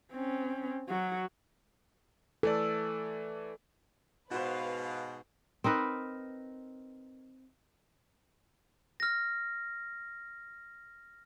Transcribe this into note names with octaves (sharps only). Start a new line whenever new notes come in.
C4 C#4
F#3 F#4
E3 A3 A4 D5
G#2 B2 F#4 B4 C5 F5
C4 D#4 A#4 B4
F6 A#6